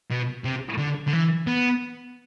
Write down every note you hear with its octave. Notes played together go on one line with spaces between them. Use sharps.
B2
C3
D3
D3
E3
B3